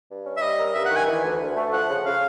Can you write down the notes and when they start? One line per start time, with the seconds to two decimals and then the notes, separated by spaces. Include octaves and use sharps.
0.09 G2
0.26 C#4
0.37 E5
0.42 G3 D#5
0.58 A#4
0.74 G2 E5
0.86 F#5
0.91 D#3
0.96 G#5
1.07 E3
1.24 D2
1.40 D2
1.57 A3
1.72 F3 F#5
1.89 C#3
2.05 C#3 F5